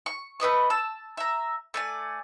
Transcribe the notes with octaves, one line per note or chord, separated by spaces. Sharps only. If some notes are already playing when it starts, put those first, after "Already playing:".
C#6
A3 B4 D#5 C#6
A5 E6
E5 A#5
A3 D5 G#5